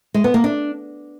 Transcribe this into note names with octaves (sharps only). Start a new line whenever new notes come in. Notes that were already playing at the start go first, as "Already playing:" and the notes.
G#3
B3
A#3
D4